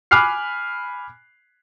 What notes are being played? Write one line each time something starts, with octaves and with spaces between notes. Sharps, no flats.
G#5 B5 D6 F6 F#6 C7